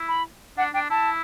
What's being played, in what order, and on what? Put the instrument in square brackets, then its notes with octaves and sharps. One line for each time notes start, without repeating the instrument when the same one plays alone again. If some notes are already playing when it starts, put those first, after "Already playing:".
Already playing: [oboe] E4
[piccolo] B5
[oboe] D4 [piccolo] F#5
[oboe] D4 [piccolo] G5
[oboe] E4 [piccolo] A5